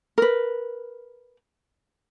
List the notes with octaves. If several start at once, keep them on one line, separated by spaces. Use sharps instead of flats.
A#4 B4